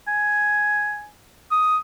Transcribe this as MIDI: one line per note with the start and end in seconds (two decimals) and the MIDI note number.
0.08 1.08 80
1.51 1.77 87